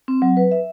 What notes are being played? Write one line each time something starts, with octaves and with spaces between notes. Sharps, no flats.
C4
F#3
B4
E5